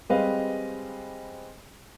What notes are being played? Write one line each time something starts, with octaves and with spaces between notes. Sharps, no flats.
G3 G#3 C4 B4 D#5 F5